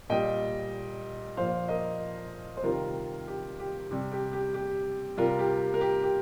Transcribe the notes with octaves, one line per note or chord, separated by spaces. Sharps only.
A#2 G3 D#5 G5
A#2 F3 C5 F5
A#4 D#5
C5
C3 D#3 G3 F4 A#4
G4
G4
C3 G3
G4
G4
G4
C3 G3 F4 A#4
G4
A#4
G4
G4